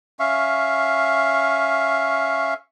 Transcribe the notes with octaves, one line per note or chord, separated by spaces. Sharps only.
C#4 E5 F5 C#6